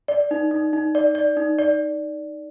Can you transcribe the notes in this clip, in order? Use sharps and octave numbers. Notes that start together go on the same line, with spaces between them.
D5
D#4
D#4
D#4
D5
D5
D#4
D5